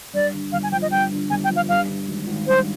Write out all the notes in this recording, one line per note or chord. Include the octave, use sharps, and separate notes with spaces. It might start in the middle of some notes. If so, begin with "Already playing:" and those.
G2 D5
D3
G1 F5
G#5
F3 G5
D#5
G2 G5
D3
G1 G#5
G5
F3
F5
G2 F5
D3
G#1
G#1
G2 C5